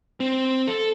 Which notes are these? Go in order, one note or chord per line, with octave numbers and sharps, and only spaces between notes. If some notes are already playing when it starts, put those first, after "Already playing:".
C4
A4